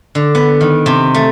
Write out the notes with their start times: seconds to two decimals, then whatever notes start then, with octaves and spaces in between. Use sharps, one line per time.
0.15 D3
0.35 B3
0.61 D#3
0.86 C3
1.14 A3